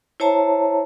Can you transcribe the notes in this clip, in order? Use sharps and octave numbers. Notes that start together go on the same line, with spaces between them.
E4 C5 C#5 E5 A5 A#5